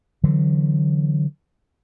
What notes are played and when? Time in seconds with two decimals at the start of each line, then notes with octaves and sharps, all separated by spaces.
0.24 D3 E3 F#3